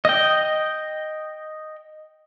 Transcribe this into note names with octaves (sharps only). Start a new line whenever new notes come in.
D#5 G5